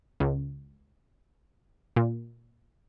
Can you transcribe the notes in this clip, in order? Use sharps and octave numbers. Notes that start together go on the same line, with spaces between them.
C#2
A#2